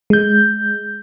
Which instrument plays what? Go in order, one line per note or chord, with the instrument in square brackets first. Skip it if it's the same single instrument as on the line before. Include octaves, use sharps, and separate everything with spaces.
[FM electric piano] G#3 G6